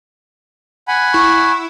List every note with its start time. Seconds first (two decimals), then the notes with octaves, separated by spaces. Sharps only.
0.88 F#5 G#5 B5
1.14 E4 C#6